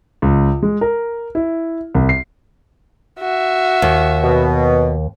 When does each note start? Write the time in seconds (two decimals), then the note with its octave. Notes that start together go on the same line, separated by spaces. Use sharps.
0.22 C#2
0.63 G#3
0.81 A#4
1.35 E4
1.95 C2
2.09 C7
3.19 F#4 E5
3.82 D#2
4.23 B2